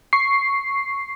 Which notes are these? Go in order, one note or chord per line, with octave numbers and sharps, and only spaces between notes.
C#6 C7